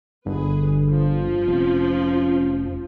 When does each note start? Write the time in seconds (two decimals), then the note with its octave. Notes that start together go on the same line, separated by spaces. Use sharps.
0.26 G1 D3 G#4 B4
0.90 F3
1.47 F1 C#4